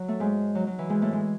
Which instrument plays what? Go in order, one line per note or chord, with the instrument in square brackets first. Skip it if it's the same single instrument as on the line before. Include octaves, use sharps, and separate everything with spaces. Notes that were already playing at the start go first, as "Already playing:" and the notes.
Already playing: [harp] F#3
A3
G#2 G#3
F#3
F#3
E3
G#2 G#3
A2 A3
G#3